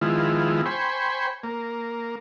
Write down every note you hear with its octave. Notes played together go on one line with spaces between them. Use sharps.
D#3 F3 G#3 B3 E4 F4
C5 G5 G#5 B5 C#6
A#3